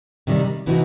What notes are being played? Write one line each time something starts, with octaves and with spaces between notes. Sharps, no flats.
C3 D#3 G3
C3 E3 B3 D#4 F#4